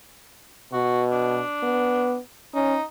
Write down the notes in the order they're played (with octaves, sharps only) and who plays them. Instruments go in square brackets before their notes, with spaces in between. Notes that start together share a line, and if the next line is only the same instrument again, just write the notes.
[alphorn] B2 [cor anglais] F#4
[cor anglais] D4
[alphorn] B3
[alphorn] C#4 [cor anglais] D#4